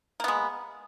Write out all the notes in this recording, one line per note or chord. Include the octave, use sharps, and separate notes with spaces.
G#3 A#3 B3